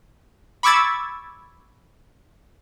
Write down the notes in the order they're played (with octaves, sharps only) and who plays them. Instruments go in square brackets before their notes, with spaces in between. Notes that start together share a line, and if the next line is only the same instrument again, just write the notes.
[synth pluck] B5 C#6 D6 E6 G#6 A6